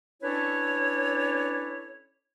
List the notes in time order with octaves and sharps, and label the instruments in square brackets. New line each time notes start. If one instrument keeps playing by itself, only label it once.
[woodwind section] C#4 D4 E4 A4 B4 C#5